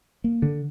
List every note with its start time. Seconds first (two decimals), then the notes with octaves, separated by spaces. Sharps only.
0.24 A#3
0.42 D3